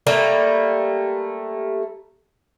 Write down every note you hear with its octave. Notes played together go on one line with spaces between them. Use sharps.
G3 A3 A#3 A#4